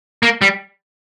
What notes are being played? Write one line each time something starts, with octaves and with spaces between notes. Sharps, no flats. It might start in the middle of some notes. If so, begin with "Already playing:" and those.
A#3
G3